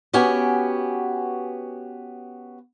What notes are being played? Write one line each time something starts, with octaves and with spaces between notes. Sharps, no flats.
B3 C#4 F#4 G4 G#5